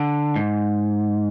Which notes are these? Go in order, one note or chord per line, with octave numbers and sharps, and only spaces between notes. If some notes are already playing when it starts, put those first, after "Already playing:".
Already playing: D3
G#2